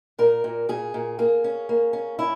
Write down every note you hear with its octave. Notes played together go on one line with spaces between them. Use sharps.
A#2 A#4
A#2
A#2 G#4
A#2
A#3 G#4
C#4
A#3
C#4
C#4 E4